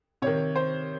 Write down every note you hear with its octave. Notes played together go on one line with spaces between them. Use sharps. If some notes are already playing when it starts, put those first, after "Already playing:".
C3 D#3 C#5
C5